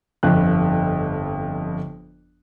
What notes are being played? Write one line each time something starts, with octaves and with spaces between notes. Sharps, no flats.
G1 F2 F#6